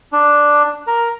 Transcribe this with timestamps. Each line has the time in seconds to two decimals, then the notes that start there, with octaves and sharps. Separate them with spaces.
0.12 D4
0.87 A#4